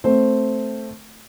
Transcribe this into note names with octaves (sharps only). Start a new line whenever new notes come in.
A3 C4 C5